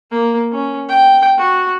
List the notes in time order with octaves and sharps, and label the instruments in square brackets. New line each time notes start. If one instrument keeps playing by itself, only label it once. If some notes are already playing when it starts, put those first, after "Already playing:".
[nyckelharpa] A#3
C#4
G5
F#4